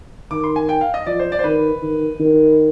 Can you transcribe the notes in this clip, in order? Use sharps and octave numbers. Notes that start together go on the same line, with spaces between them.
D#3 D6
C6
G#5
G5
F5
D#5
F3 D5
C5
D5
C5
D#3 B4
D#3
D#3